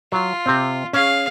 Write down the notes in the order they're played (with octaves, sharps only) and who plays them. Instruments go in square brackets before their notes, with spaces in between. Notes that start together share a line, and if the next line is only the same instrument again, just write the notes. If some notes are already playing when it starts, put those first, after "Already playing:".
[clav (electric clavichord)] F#3 [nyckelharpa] F4
[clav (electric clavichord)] C3 C4
[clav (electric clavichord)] C#4 [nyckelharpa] G#4 F5